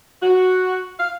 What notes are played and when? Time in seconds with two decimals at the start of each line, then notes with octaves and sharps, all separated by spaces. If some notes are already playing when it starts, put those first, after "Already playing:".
0.23 F#4
1.00 F5